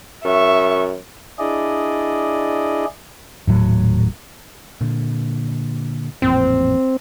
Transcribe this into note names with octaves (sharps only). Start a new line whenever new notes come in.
F#2 E5 C#6
D4 E4 G#4 D5 D#5
D#1 A2 F#3
A#2 D3
A1 F2 A#2 C4